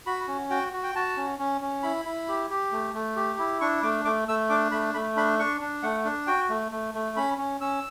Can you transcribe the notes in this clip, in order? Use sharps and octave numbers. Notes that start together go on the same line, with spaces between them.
F#4 B5
C#4
F#4 G5
F#4
G5
F#4 A5
C#4
C#4
C#4
E4 B5
E4
G4
G4
A3
A3
G4
E4
D4 C#6
A3 D6
A3 D6
A3 E6
D4 D6
A3 B5
A3 B5
D4 B5
D4 C#6
D4
A3 F#5
D4
F#4 G5
A3
A3
A3
C#4 B5
C#4
C#4 E6